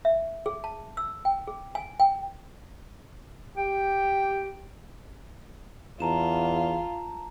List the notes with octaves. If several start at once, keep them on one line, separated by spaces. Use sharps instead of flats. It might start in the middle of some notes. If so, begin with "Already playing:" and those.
E5
G#4
A5
E6
G5
G#4
G#5
G5
G4 G5
E2 F4 A5 A#5 E7